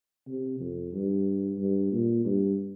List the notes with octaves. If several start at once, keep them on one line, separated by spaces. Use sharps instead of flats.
C3
F2
G2
G2
A#2
G2